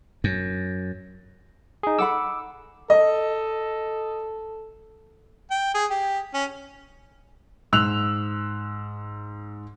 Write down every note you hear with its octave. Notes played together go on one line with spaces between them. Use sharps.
F#2
D#4 G#4
A4 F#5 B5 D6 E6
A4 D#5
G5
G#4
G4
C#4
G#2 E6 F#6 F7